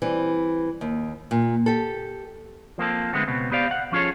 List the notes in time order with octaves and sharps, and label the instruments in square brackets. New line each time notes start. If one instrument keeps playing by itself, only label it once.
[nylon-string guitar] E3 G3 C4
D#2
A#2
G4 A4
[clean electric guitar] F3 A#3 C4 A4
D3 G#3 A3 B3 C4
C#2 B2 B3 C4
B3 G4 C5 D5 F5
F5 F#5
F3 C#4 F4 G#4 A4 C#5